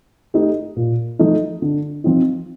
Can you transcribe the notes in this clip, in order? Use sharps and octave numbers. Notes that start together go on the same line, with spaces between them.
A3 D#4 G4
A#2
F3 A3 D#4
D3
F3 C4 D#4